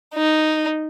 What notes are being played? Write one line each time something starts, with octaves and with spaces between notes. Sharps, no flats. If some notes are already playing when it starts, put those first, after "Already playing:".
D#4